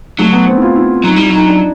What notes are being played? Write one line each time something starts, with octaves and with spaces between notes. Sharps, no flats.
F#3 A3
B3
C4
E4
F4
E4
F#3 D#4
G3 E4
F#3 D#4
D4